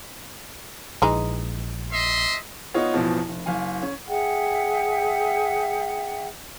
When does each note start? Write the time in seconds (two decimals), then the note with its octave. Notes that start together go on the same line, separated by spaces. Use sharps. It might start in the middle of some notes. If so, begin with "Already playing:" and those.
1.02 A#1 E3 G#3 D#4
1.92 D#5 E5 C6
2.74 B3 D#4 F4 C#5
2.94 A1 E2 B2 F3
3.29 F1
3.46 F#1 F5 G#5
3.83 C#4
4.06 G#4 E5 F#5 G5